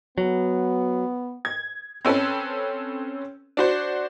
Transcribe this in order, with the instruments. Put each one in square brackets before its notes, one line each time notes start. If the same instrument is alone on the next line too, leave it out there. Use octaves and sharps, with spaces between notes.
[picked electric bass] F#3 [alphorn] B3
[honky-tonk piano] G#6
C4 C#4 A4 B4
D4 F#4 C5